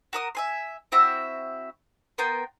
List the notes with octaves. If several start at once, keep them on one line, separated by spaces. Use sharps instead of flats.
F#4 A#4 D#6
E5 G#5 C6
C4 E4 F#4 E5
B3 A#4 G5 C6